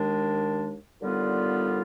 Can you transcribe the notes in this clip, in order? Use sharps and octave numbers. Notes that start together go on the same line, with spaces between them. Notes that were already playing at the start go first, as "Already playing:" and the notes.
Already playing: D#2 D#3 G#3 D4
D#2 D3 G3 B3 F4